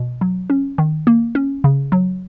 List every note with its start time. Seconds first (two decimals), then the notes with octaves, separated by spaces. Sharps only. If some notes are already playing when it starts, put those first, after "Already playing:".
Already playing: B2
0.21 F#3
0.50 C#4
0.78 D#3
1.07 A#3
1.35 C#4
1.64 C#3
1.92 F#3